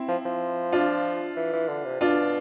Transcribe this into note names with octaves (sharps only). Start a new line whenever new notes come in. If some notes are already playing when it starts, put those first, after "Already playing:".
Already playing: C4 E4
F3
F3
D4 F4
E3
E3
D3
C3
B2 D4 F4